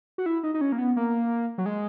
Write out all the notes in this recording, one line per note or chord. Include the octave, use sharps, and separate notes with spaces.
F#4
E4
D#4
D#4
C#4
A#3
B3
A#3
F#3
G#3